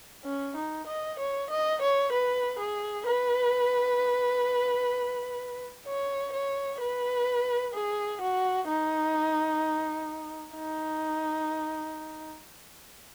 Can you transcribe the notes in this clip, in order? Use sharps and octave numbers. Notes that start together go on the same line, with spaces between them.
C#4
D#4
D#5
C#5
D#5
C#5
B4
G#4
B4
C#5
C#5
B4
G#4
F#4
D#4
D#4